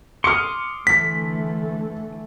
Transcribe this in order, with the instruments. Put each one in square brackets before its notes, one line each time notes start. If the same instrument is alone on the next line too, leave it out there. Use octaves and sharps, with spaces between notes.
[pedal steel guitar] C6 D6 D#6 [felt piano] F6 C#7
[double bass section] D3 E3 A3 [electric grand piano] B6